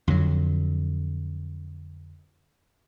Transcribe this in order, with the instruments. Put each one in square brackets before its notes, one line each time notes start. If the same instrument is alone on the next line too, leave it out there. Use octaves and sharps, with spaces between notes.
[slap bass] F2 D3 F#3